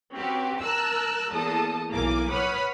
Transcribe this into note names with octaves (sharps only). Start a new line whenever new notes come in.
C4 C#4 F#4 G4 B4
A#4 A5 E6 F#6
E2 A#3 A4 A5 D#6
B1 E3 A#3 G#5 D6
B4 C#5 F#5 B5 D#6 F6